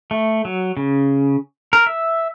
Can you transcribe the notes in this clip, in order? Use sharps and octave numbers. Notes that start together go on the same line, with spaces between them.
A3
F#3
C#3
A#4
E5